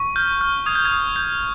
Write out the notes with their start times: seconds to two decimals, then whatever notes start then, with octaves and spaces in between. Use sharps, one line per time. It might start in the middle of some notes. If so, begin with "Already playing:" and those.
Already playing: C#6
0.16 F6 G6
0.41 F6
0.66 D#6 G#6
0.75 G6
0.85 G#6
0.91 D#6
1.16 G6